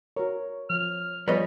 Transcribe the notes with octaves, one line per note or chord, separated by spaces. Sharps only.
F#4 A#4 C#5
F3 F6
F3 G3 B3 G#4 B4 C#5 D#5